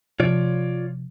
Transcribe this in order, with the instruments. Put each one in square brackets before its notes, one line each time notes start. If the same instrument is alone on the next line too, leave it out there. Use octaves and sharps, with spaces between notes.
[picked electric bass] C3 F3 [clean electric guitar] F4 C#5 D5